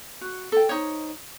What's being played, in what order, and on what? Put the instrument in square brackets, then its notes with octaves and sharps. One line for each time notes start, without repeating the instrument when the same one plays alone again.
[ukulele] F#4
A4 G5
D#4 C5 C#5